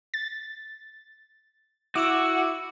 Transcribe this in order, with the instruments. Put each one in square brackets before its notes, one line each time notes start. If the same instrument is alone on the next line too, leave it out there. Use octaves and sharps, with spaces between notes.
[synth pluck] A6
[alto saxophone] E4 [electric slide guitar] F#4 [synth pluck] D6 E6